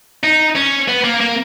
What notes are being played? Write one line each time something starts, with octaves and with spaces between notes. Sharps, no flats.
D#4
C#4
B3
A#3
A#3